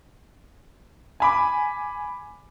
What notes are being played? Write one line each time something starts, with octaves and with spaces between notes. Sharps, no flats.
G#5 B5 D6